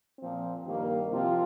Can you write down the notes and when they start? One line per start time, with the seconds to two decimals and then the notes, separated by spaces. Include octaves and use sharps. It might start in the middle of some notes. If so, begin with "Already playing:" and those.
0.19 A#2 F3 C4
0.64 G2 D#3 G3 A#3
1.10 C3 F3 C4 F4